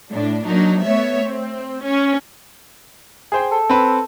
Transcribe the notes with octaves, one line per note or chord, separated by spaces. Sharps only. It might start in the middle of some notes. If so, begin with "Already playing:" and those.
A2 D4
F#3 A#3 D4 D#4
A3 B3 C#5 E5
C4
C#4
G#4 C5 G5
A4
C4 B4